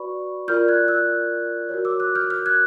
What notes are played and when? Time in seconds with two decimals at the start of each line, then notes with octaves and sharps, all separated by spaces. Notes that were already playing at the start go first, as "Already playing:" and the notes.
Already playing: F#4 B4 D5 B5 C#6
0.48 F4 A#4 D5 F6 G6
0.68 F#6 G#6
0.88 E6 F#6
1.69 F#4 A#4 C#5
1.85 D6 E6
2.00 E6 F#6
2.15 F6 G6
2.30 F6 G6
2.46 F#6 G#6